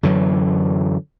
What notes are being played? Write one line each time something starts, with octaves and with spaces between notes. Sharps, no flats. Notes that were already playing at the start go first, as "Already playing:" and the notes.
F#2 D3 E3 F#3